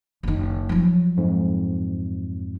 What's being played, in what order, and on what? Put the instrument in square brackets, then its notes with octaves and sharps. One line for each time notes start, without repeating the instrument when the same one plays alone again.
[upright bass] F#1 D#3
F3 F#3
[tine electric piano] F2 G#2